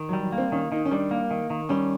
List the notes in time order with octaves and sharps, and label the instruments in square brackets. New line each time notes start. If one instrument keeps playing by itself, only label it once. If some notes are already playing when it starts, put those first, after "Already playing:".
Already playing: [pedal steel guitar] D#3
[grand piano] F#3
[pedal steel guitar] G3
[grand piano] F#3
[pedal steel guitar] A#3
[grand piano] C4
[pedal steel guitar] D#3 [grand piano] C#4
[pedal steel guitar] D#3 [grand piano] D#4
[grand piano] C#4
[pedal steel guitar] G3 [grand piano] D4
[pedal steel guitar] A#3
D#3
D#3
[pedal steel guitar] G3 [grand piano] C#4